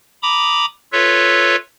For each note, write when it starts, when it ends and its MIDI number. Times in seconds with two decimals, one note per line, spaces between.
0.23 0.66 82
0.23 0.66 83
0.23 0.66 86
0.23 0.66 87
0.93 1.56 65
0.93 1.56 69
0.93 1.56 71
0.93 1.56 73
0.93 1.56 76